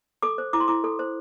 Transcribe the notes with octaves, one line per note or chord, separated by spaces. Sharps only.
A4 D6
C5
E4 D6
C6
E4 D6
A4
C5